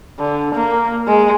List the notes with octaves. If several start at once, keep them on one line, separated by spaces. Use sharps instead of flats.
D3
A#3
G#3